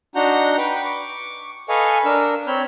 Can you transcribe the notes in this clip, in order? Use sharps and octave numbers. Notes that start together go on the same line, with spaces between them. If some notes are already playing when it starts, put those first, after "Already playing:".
D4 D#4 F#4 F#5 A#5 G6
B4 G5
C#6 D6
A4 B4 D#5 F5 G#5 C#6
D4 A#4 E6
C4 C#5 B5 F6 G6